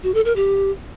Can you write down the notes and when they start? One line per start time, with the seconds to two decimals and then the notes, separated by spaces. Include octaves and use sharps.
0.03 F#4
0.14 A4
0.25 A#4
0.36 G4